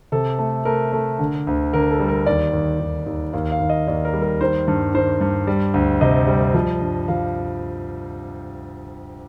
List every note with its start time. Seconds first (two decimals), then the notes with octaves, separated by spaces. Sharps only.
0.12 C3 A4
0.39 A3
0.65 A3 A#4
0.93 A3
1.19 D3
1.47 D2
1.73 D3 A#4
1.91 A4
2.00 G3
2.08 A#4
2.26 D#2 D5
2.53 D#2
2.80 D#2
3.06 D#2
3.33 D#2 F5
3.52 F5
3.60 D#2
3.70 D#5
3.87 D#2 D5
4.05 A#4
4.13 G3
4.22 A#4
4.41 D#3 C5
4.68 G2
4.94 D#3 C5
5.21 G2
5.47 G3
5.74 D2
6.01 C3 D#5
6.27 G3
6.54 F3
6.81 G2
7.08 F3 F5